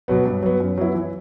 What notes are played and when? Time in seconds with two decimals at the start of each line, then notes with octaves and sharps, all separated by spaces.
0.08 B2 F#3 B3
0.25 G2
0.43 F#3 B3
0.60 F#2
0.77 F#3 B3 E4
0.95 E3